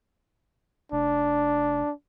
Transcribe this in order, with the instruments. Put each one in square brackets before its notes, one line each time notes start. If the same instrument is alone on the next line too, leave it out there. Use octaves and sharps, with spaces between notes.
[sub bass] F1 [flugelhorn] D4